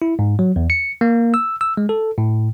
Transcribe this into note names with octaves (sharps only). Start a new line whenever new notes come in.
E4
G#2
F#3
E2
C#7
A#3
E6
E6
G#3
A4
A2